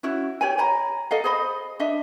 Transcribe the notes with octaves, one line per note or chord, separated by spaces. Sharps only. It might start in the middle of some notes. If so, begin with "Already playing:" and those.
C#4 E4 F#4
G4 C#5 G#5
C#5 G#5 A#5 B5
A4 D#5 F5
G#4 C5 D#5 B5
D4 D#5 E5